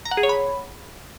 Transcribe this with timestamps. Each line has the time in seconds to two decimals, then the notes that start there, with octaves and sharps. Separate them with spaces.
0.05 A#5
0.11 F#5
0.17 G#4
0.23 C#5
0.29 B5